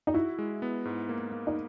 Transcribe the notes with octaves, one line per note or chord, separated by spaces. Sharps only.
D#4
E4 F#4
G#3
B3
G#2
A#3
A#3
D#4